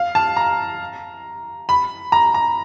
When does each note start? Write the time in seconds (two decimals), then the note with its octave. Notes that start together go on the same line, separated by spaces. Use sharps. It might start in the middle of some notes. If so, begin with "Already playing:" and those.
Already playing: F5
0.15 A5
0.37 A#5
1.69 B5
2.12 A#5
2.34 A#5